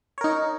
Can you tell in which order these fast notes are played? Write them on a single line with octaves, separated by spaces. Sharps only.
C#5 A#4 D#4